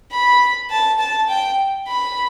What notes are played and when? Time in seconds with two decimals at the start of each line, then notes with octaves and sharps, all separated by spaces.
0.11 B5
0.70 A5
0.99 A5
1.29 G5
1.87 B5